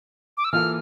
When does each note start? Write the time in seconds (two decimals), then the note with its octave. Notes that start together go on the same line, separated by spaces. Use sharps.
0.37 D6
0.44 E6
0.52 E3 A#3 F4 A4 F6